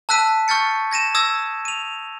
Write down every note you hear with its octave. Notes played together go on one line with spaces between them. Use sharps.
A5 E6 F#6 B6 D#7
C#6 F6 G6 A6 C#7
G#6 A#6 D#7 E7
D#6 E6 G#6 A#6
D#7 F7